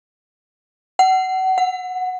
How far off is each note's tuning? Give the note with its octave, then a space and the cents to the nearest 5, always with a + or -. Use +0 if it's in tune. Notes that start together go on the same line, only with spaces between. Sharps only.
F#5 +30
F#5 -10